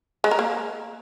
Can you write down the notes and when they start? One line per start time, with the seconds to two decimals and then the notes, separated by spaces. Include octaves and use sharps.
0.24 G#3
0.31 A#4
0.39 A#3